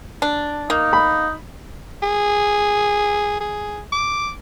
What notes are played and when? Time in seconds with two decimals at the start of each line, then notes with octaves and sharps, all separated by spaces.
0.22 D4
0.70 A#3 D#4
0.93 B5
2.02 G#4
3.40 G#4
3.92 D6